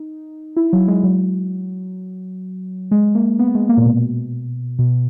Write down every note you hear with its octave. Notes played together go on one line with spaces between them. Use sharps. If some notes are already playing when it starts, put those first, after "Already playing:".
Already playing: D#4
E4
F#3
G#3
F#3
G#3
A#3
B3
G#3
A#3
A#2
B2
B2